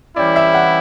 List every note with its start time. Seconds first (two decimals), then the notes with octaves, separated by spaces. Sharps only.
0.16 E3 G3 C#4 E4 D5
0.36 E5
0.54 F#5